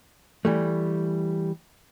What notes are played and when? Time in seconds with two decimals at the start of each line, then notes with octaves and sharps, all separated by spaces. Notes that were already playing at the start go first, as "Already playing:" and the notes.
0.45 E3 G3 A3